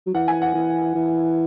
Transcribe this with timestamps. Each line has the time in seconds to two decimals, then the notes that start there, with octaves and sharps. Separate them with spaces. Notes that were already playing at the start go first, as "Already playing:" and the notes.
0.07 F#3
0.14 E3 F#5
0.28 G#5
0.42 F#5
0.55 E3
0.95 E3